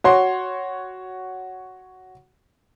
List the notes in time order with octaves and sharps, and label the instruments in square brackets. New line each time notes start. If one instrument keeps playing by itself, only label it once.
[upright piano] F#4 C#5 C6